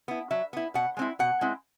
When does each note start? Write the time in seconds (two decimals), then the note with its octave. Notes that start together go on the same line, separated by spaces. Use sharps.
0.08 B3 E4
0.31 F#3 E5
0.53 B3 E4
0.74 B2 F#5
0.97 G#3 C4 E4
1.19 B2 F#5
1.41 G#3 C4 E4